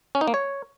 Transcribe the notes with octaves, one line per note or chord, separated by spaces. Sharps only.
C#4
D#4
A#3
C#5